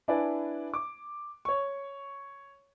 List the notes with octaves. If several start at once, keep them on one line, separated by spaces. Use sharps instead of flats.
D4 E4 B4 D5 G#5
D6
C#5 C#6